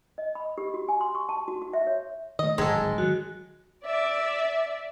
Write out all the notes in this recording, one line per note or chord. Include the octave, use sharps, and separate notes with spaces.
D#5
B5
G4
F#4
G#5
C6
C#6
A5
F#4
F#4
E5
C#5
D#3 A3 D#5
D1 G#1 D#3 F3 G#3 A4
D#3 F#3 F#4
D5 E5